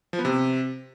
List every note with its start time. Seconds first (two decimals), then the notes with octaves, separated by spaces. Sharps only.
0.13 F3
0.19 B3
0.25 C3